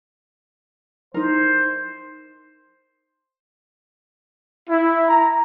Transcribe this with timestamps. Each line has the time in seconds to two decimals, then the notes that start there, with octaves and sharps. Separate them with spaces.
1.14 D#4 A#4 C5
4.69 E4
5.09 A#5